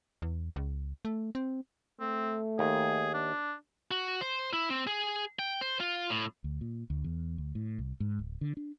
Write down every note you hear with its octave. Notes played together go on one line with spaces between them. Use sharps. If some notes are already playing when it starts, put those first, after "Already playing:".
E2
C#2
A3
C4
A3 C4
D#2 G#4
D4
F#4
C5
E4
C4
G#4
G5
C5
F4
A2
D2
A#2
D2
E2
D2
A2
C2
G#2
D1
D3
D4